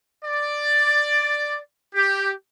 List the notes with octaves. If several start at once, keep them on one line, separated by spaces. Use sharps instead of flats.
D5
G4